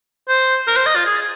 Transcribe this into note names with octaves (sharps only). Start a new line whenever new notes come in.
C5
A#4
C5
D#5
F4
G#4